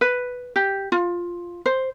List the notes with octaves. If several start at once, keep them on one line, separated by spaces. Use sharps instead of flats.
B4
G4
F4
C5